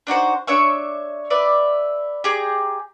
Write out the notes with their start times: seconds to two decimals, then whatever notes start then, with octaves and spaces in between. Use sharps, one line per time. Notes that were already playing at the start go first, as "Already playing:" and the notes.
0.07 D4 D#4 F#4 C5
0.47 D4 C#5 E5 C#6
1.30 B4 D5 E5
2.24 G4 G#4 G5 A#5